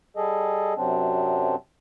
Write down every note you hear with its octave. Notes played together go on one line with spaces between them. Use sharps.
G3 G#4 A4 D#5
F#2 C3 F#3 C4 D4